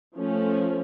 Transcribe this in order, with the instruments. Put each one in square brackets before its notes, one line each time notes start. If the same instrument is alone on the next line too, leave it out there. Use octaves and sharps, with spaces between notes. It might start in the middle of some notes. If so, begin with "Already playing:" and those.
[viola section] F3 A3 C#4